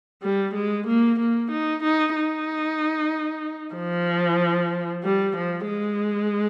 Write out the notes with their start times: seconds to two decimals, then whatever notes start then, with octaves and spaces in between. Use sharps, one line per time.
0.22 G3
0.54 G#3
0.87 A#3
1.19 A#3
1.51 D#4
1.83 D#4
2.15 D#4
3.75 F3
5.03 G3
5.36 F3
5.68 G#3